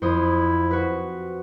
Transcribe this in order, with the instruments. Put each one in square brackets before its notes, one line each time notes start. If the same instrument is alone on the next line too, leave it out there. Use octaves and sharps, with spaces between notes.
[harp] F2 C5 D#6 [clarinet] E4
[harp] F#4 B4